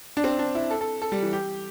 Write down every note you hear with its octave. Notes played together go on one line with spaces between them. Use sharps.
D4
C4
D4
E4
A4
A4
A4
G3
E3
G4